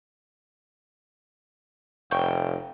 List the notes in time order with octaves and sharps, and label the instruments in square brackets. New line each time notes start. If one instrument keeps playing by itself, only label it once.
[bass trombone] F1 [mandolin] G5 C#6